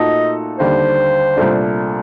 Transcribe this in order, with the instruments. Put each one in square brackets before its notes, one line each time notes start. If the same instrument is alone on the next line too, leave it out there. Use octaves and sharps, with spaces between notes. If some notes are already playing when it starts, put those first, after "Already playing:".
Already playing: [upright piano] A#2 A3 D#4 F#4 A4 [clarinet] D#5
[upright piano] D#2 D3 G3 [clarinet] C5
[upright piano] C2 A#2 A3 D4